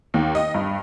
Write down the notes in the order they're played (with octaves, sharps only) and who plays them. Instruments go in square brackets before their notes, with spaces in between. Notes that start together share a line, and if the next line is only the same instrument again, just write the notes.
[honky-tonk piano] D#2
D#5
G2